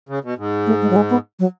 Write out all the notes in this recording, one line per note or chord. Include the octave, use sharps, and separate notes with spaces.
C#3
B2
G#2
A3
G#3
F#3
G#3
B3
F#3